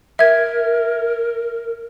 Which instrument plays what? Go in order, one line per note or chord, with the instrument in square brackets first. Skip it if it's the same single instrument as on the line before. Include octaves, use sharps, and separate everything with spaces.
[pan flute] A#4 [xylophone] E5 G#6